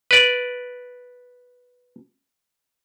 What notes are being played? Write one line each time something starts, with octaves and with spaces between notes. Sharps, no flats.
B4 D5